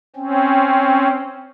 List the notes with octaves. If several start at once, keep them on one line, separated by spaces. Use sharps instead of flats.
C4 C#4